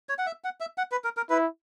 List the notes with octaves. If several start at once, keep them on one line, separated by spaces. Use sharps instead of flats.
C#5
F#5
E5
F#5
E5
F#5
B4
A#4
A#4
E4 B4